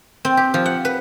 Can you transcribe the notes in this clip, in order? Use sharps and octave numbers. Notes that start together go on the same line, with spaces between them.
C4
G4
F3
F#5
B4